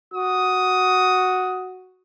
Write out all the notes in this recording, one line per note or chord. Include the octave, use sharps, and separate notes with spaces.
F#4 D#6